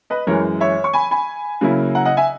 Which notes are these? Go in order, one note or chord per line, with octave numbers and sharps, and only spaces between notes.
B4 D#5
F#2 E3 G#3 A#4 C#5
C#5 E5
C#6
G#5 B5
G#5 B5
C#3 F#3 A#3 C#4 E4
F#5 A#5
D#5 F#5
E5 G#5